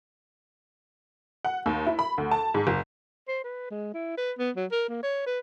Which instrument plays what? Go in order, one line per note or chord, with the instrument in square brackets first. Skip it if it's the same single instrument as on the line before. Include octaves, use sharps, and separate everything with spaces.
[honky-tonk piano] F#5
D#2
E4
B5
D2
A5
G#2
F#1
[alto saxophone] C5
B4
G#3
E4
B4
B3
F#3
A#4
A#3
C#5
B4